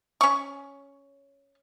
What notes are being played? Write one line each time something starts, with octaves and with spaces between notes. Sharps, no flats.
C#4 C#6